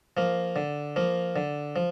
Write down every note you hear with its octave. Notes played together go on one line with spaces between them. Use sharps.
F3 A#3
D3
F3 A#3
D3
F3